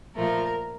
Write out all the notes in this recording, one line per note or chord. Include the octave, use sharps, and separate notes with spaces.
A#2 F3 A3 A#4